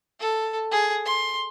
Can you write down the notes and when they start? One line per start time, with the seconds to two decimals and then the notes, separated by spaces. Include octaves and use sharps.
0.20 A4
0.72 G#4
1.05 C6